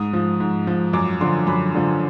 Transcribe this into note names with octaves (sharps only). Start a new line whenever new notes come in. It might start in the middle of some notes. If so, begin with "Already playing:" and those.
Already playing: G#2 D#6
F3
G#2
F3
F#2 D6
D3 F3 C6
F#2 B5
D3 F3